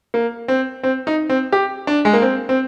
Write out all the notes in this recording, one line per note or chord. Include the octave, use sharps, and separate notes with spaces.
A#3
C4
C4
D#4
C4
G4
D4
G#3
A#3
C4
C4